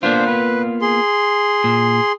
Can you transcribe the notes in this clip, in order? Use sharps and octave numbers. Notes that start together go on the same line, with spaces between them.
A#3 B3 D4 F4 C5
B4
G#4 C6
A#2